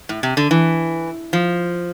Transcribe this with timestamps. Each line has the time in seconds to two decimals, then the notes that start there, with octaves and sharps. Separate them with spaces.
0.09 A2
0.23 C3
0.37 D3
0.51 E3
1.33 F3